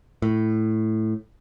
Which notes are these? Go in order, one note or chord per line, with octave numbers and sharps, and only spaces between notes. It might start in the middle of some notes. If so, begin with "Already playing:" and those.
A2